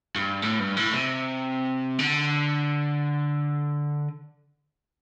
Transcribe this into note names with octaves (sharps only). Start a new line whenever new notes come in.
G2
A2
G2
A2
C3
D3